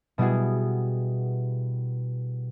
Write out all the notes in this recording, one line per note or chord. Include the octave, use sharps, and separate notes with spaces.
B2 G3 B3 E4 F#4 G#4